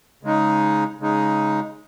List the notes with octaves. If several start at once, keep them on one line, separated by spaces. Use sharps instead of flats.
C#3 G#3 D#4
C#3 G#3 D#4